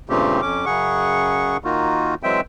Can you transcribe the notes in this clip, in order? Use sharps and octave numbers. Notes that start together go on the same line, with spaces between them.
G2 A#2 C#3 A3 C4 G4
F2 C#4 D6
F#2 C#3 G#4 F#5 C#6
D#3 A#3 D#4 F4 F#4
E3 F#3 G#3 C4 E5 G5